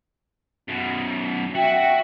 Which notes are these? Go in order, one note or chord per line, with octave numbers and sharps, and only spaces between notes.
F#2 B2
F#4 E5 F#5 G5